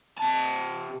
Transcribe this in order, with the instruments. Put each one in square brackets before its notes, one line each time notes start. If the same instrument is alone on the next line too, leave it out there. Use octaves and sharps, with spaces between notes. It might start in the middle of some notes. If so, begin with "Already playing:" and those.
[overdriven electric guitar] C3 A5